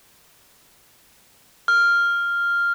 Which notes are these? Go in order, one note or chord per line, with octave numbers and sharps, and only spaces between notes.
F6